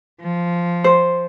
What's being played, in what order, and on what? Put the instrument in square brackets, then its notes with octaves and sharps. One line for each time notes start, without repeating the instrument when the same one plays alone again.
[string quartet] F3
[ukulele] C5